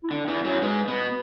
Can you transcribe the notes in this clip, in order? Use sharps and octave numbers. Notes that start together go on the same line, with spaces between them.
E4
D3 D4
E2 E3
E4
F#2 F#3
G#2 G#3 B4
B2 B3